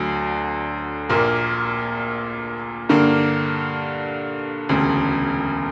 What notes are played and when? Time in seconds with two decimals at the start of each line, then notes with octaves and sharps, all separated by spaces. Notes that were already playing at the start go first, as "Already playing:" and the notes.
Already playing: D2 D3 F#3
1.09 A#1 A#2 A#3
2.89 G2 D3 A#3
4.69 E1 D2 C#3